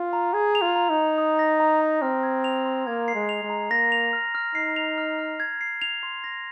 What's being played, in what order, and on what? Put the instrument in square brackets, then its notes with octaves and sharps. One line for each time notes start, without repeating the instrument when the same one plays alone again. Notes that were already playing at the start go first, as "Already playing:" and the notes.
Already playing: [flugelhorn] F4
[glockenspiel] A#5
[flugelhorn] G#4 [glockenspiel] G#6
[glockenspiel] F7
[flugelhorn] F4
[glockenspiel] A#5
[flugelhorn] D#4
[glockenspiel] A#5
D#6
A#6
A#5
A#5
[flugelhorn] C4 [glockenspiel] F6
[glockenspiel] G#6
F7
C6
[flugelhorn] A#3 [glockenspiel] G#6
[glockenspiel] C7
[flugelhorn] G#3
[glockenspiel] F7
[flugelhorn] G#3
[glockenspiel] A#5
[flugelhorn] A#3 [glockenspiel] A#6
[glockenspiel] F7
F6
F6
[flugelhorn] D#4 [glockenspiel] C7
[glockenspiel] F7
F6
F6
G#6
C7
F7
C6
A#6